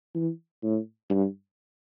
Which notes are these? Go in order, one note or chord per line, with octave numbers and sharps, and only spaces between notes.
E3
A2
G2